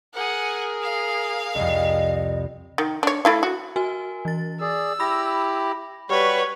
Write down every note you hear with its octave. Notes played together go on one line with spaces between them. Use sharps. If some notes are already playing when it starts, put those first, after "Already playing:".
G#4 A#4 F#5 G#5
F5
C2 F2 D#5
D#3
D4 C#5
A3 E4 F5
F#4
F#4 A#4 G#5
E3 A6
G#4 D5 E6
E4 G4 B5 A#6
G3 F#4 G4 B4 C#5